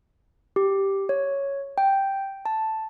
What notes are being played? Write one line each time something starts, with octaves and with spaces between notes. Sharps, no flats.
G4
C#5
G5
A5